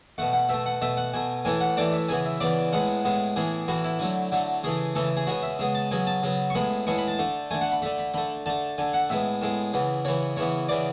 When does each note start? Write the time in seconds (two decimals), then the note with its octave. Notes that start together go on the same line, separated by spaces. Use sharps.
0.18 B2 A3 F#5
0.33 F#5
0.49 B2 A3 E5
0.66 F#5
0.82 B2 A3 E5
0.97 F#5
1.14 B2 A3 G#5
1.45 A2 E3 A3 G#5
1.61 F#5
1.77 A2 E3 A3 D5
1.93 E5
2.09 C#3 E3 B3 G#5
2.25 E5
2.40 C#3 E3 B3 D5
2.72 A2 G#3 B3 F#5
3.04 A2 G#3 B3
3.36 A2 E3 B3 G#4
3.68 A2 E3 B3 F#4
3.84 E4
3.99 D3 F#3 A3
4.32 D3 F#3 A3
4.63 C#3 E3 A3 G#4
4.95 C#3 E3 A3 A4
5.17 G#4
5.27 C#3 G#3 B3 F#4
5.43 E5
5.59 C#3 G#3 B3
5.75 A5
5.91 C#3 F#3 B3 G#5
6.07 A5
6.23 C#3 F#3 B3
6.50 C#6
6.55 A2 G#3 B3 B5
6.87 A2 G#3 B3 C#6
6.98 B5
7.08 A5
7.19 D3 A3
7.51 D3 A3 G#5
7.61 F#5
7.71 B5
7.82 D3 A3 B5
7.99 B5
8.14 D3 A3 B5
8.46 D3 A3 A5
8.78 D3 A3 G#5
8.94 F#5
9.09 A2 G#3 B3 E5
9.41 A2 G#3 B3
9.74 C#3 E3 B3
10.05 C#3 E3 B3 C#5
10.37 C#3 E3 B3 C#5
10.69 C#3 E3 B3 D5